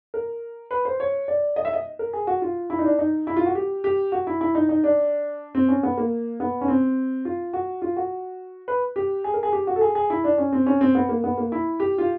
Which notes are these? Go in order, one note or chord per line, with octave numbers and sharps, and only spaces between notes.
A#4
B4
C5
C#5
D5
D#5
E5
D#5
A#4
G#4
F#4
F4
E4
D#4
D4
D#4
E4
F4
F#4
G4
G4
F#4
E4
E4
D#4
D#4
D4
C4
C#4
B3
A#3
B3
C#4
C4
F4
F#4
F4
F#4
B4
G4
G#4
A#4
G#4
G4
F#4
A4
G#4
G#4
E4
D4
C#4
C4
C#4
C4
B3
A#3
B3
A#3
E4
G4
F4